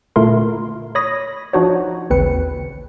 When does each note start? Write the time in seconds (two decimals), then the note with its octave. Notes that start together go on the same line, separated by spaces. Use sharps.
0.16 A#2 D3 A3 E4 A#4 C6
0.95 C#5 B5 D#6 A#6
1.53 F3 D4 D#4 F#4 C5 C#5
2.10 A1 D#2 C#3 C4 B4 C#7